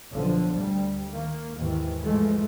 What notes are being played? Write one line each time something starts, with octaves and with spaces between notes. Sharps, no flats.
B1 D3 F3
D2 G3
D#3 A#3
D#2 G#2 D#3 E3
G#2 E3 F3 G#3 A3